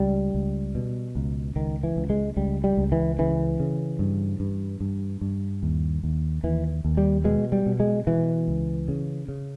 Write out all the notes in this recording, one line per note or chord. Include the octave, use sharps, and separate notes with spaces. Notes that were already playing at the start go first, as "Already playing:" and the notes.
Already playing: C#2 G3
C#2
B2
C#2
C#2 D#3
E3
C#2
G#3
C#2 G3
G3
C#2
E3
C#3 E3
C#3
G2
G2
G2
G2
D#2
D#2
D#2 E3
D#2
G3
B2 G#3
G3
B2
G#3
B2 E3
C#2
C#3
C#3